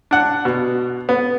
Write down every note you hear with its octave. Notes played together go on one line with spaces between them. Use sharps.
D4 F#5
B2
B3